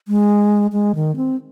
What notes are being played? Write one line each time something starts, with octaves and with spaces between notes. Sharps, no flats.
G#3
G#3
D#3
C4